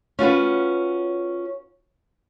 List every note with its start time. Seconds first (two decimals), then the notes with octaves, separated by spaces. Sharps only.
0.19 C#4 F4 F#4 B4